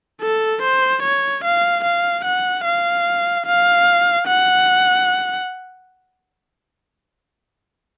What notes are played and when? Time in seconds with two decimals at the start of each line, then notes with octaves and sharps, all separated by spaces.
0.21 A4
0.61 C5
1.02 C#5
1.44 F5
1.84 F5
2.25 F#5
2.65 F5
3.46 F5
4.27 F#5